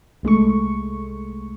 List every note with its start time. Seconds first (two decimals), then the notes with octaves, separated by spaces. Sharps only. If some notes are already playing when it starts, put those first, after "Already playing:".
0.23 C2 G#3 A3 C#6